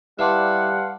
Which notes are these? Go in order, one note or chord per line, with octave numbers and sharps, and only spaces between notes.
G3 E4 B4 D5 F5 F#5 A5 C6